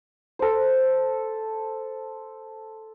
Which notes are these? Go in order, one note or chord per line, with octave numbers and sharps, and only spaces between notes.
A4 C5